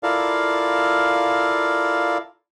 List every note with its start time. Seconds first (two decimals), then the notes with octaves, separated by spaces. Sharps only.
0.03 E4 F4 A4 A#4 D5 F5